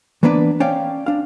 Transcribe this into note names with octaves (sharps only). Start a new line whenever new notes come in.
E3 A#3 B3 D4 B4 D5
C#4 C#5 D5 F5 G5
D4 F5